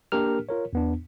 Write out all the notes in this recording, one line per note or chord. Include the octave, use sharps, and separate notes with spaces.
A#3 D4 G4 A#4 F6
F4 A#4 C#5
E2 B3 D4